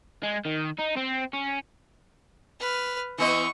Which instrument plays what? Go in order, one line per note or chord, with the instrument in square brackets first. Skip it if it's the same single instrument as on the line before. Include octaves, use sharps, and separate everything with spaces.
[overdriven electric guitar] G#3
D#3
D#4
C4
C#4
[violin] B4 F6
[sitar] E3 B3 D#5 [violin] C#6